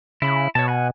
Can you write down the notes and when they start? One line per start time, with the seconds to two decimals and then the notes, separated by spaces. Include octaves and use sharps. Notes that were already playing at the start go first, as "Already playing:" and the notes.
0.22 C#3 E4 B5
0.55 B2 C#5 A5
0.68 F#5 G#5